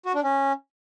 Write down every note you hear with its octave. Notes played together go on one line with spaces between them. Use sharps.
F#4
D4
C#4